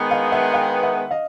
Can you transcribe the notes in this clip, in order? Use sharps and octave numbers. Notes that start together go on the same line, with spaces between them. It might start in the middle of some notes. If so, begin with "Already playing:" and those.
Already playing: D#3 G#3 B3
D#5 F5
E5 F#5
F5 G5
E5 F#5
D#5 F5